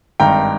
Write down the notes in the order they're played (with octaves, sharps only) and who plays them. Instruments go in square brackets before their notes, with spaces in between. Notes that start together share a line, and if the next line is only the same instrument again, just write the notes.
[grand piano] G#1 G2 D#3 G5 A#5